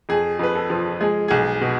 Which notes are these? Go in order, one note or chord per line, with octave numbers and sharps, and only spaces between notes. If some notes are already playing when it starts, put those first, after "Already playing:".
F2 G#4
F2 B4
A4
F3
G#3 G#4
B1 G#4
B2